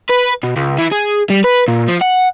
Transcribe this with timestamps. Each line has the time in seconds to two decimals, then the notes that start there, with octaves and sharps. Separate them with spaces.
0.10 B4
0.43 B2
0.57 C#2
0.78 E3
0.92 G#4
1.30 G3
1.44 B4
1.68 A#2
1.88 F3
2.01 F#5